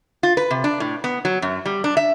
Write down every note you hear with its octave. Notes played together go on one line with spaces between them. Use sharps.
F4
B4
C3
D4
A2
B3
F#3
F#2
G3
D4
E5